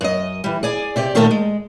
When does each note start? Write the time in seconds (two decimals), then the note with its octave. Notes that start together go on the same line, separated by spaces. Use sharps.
0.01 F#2 D#5
0.44 E3 G3
0.63 G#4 D5 G#5
0.96 C3 G4 D5
1.15 A#2 D#3 A3 G4 A4 A#4
1.31 G#3